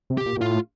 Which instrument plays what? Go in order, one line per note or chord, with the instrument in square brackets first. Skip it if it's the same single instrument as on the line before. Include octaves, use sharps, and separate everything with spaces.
[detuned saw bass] C3
[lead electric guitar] G4
[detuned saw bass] A#2
A#2
[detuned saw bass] A2 [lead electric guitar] F4